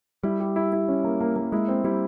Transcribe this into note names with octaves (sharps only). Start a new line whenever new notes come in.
G3 E4
G4
E4
E4
C#4
A#3
A#3
A#3
G#3 E4
C4
G3 E4